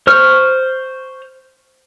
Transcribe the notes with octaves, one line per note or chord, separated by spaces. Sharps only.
C5 C#6 F6